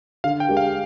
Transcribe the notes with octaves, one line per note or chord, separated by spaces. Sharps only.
D3 F5
G5
G#3 D4 G4 A#4
F5